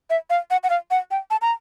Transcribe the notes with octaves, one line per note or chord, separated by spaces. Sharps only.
E5
F5
F#5
F#5
F5
F#5
G5
A5
A#5